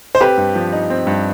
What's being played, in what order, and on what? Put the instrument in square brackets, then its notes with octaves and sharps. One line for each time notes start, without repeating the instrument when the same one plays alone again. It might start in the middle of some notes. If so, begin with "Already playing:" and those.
[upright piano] C5
[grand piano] C4 [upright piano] G4 B4
[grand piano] G2
F3
D#4
C4
G2